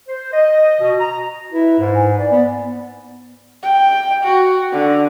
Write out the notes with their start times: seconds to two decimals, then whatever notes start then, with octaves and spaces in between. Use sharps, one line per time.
0.08 C5
0.32 D#5
0.79 B2
1.00 A#5
1.52 E4 B4
1.80 G#2
1.93 G#5
2.17 D5
2.32 B3
3.63 G5
4.24 F#4
4.73 D3